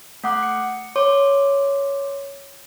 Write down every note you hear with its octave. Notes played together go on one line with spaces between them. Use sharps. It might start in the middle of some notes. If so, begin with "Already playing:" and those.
A3 F#5 D6 F#6
C#7
C#5 C6 D6